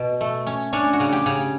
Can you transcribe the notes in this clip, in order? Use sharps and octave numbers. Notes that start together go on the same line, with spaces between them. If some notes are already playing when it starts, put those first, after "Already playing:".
Already playing: B2
A3
C#4
C#4 D4
F#4
C#3
G4
C#3